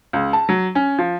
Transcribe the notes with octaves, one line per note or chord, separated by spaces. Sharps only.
C#2
A5
F#3
C#4
F3